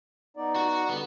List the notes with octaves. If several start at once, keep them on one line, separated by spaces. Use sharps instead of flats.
B3 D#4 D5
F#4
D3 G3 B3